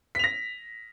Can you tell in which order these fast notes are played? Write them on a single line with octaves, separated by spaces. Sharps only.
B6 F7 A#6